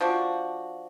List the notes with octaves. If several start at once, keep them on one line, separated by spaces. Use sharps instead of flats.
F3 D4 F#4